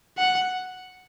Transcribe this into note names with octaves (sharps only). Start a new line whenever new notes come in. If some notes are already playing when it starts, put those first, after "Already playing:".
F#5